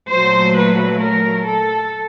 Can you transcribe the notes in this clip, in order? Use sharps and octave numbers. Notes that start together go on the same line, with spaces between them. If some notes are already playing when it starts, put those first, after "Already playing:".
A#2 F#3 A3 C5
B4
A#4
A4